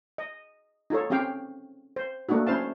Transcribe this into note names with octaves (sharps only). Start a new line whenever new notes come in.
D#5
D#4 F4 A4 C#5
C4 C#4 G4 F5 G5
C5
A3 A#3 D4 D#4 F#4
C#4 E4 C5 F5 A5